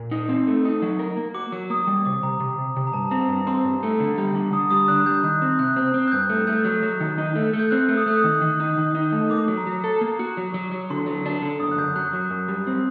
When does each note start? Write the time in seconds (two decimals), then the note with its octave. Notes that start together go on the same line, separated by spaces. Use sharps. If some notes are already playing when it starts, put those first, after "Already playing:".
Already playing: A#2
0.11 D#4
0.29 C4
0.47 A3
0.65 D#4
0.82 F#3
0.99 A#4
1.17 A#3
1.34 F#4 D6
1.52 F#3 D6
1.70 A#3 D#6
1.87 G3
2.05 C3 D6
2.23 C3 A#5
2.40 C3
2.58 C3
2.77 C3
2.87 A#5
2.93 G2 A5
3.11 C4 A#5
3.29 G2 A#5
3.47 C4 C6
3.65 G2
3.83 A3
4.00 D3
4.18 G3
4.35 D3
4.53 D3 D#6
4.71 G3 D#6
4.88 D4 F#6
5.06 G3 G6
5.23 D#3 F#6
5.42 C4
5.59 C3 F#6
5.76 C4
5.94 C4
6.08 F#6
6.12 G2 G6
6.29 A3
6.47 A3 G6
6.65 F#3
6.83 F#3
7.01 D#3
7.18 D#4
7.36 A3
7.53 A3
7.60 G6
7.71 C4 F#6
7.89 A3
7.97 D#6
8.06 A3 F#6
8.17 D#6
8.24 D#3
8.42 D#3
8.60 D#4
8.78 D#3
8.95 D#4
9.12 A3
9.30 A#3 D6
9.48 F#3
9.57 A#5
9.67 F#3
9.84 A4
10.01 A#3
10.19 F#4
10.37 F#3
10.54 F#3
10.72 F#3
10.90 D3 C6
11.07 F#3
11.26 D4
11.42 D3
11.60 F#2 D#6
11.71 F#6
11.78 F#2 G6
11.96 F#3 F#6
12.13 F#3
12.31 F#2
12.48 G3
12.67 C4